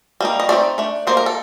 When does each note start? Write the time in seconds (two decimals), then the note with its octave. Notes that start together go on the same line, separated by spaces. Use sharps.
0.21 G3 A#3 D#4
0.40 D#5
0.49 A3 C4 D#4 D5
0.78 A3 D4
1.07 F3 A#3 D#4 C5
1.17 A#4
1.26 A4